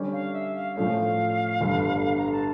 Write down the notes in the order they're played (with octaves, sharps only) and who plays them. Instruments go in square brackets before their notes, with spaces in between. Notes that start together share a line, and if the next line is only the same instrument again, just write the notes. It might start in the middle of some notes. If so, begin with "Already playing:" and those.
Already playing: [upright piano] D3 G3 C#4
[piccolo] F5
E5
F5
[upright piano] A2 F3 A3 C#4 [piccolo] F5
[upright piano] G1 G2 D3
[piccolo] A#5
A5